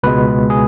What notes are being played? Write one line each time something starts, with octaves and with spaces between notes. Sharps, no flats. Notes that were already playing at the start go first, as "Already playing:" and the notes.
C#2 B2 G#3 B4
G#4